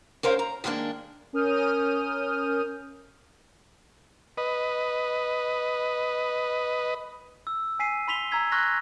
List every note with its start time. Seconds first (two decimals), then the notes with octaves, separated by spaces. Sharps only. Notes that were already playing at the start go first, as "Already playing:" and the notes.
0.23 C#4 A#4 C5 F5
0.39 A#5
0.64 D#3 G#3 A#3 C#4 D4
1.33 C#4 A#4 D#6 F6 G6 D#7
4.37 B4 D#5
7.47 E6
7.79 G#5 B6 C7 D#7
8.08 B5 C6 B6 F7 G7
8.31 A#5 E6 G#6 B6
8.52 C6 C#6 F6 F#6 G#6 A#6